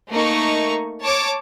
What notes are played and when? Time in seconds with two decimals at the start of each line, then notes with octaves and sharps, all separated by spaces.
0.11 A3 A#3 D#4 C#6
1.03 C#5 A5 D6